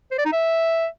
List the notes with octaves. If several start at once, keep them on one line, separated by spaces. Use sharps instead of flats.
C5
D5
D#4
E5